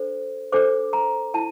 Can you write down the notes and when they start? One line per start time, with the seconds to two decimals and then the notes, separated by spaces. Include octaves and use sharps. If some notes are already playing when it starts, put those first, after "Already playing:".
Already playing: D4 A4 C5
0.52 D4 A4 C5 D6
0.93 A#5
1.34 E4 A5